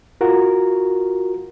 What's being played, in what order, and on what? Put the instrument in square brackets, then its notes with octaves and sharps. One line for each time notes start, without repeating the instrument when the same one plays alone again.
[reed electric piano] F4 F#4 A#4